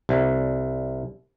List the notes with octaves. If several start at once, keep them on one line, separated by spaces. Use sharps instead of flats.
C2